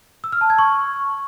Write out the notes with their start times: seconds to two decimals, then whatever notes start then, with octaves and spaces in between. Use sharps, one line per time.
0.24 E6
0.32 F6
0.41 A5
0.50 G#6
0.59 C#6